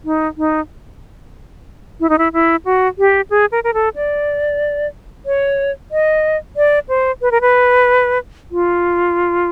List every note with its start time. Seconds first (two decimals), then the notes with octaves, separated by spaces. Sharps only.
0.05 D#4
0.38 D#4
2.00 E4
2.09 D#4
2.18 E4
2.33 E4
2.65 F#4
2.98 G4
3.30 G#4
3.52 A#4
3.64 A#4
3.74 A4
3.96 D5
5.26 C#5
5.91 D#5
6.56 D5
6.89 C5
7.22 B4
7.31 A#4
7.41 B4
8.51 F4